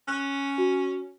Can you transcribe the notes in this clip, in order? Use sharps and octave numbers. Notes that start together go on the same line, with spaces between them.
C#4 F#6
F#4